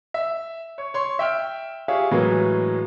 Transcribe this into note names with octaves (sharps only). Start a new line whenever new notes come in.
E5
C#5
C#5 C6
E5 G5 F6
F4 G4 G#4 C#5 E5
A2 E3 F#3 G#3 A#3